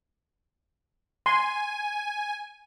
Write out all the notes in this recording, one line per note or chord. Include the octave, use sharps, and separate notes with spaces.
G#5 C6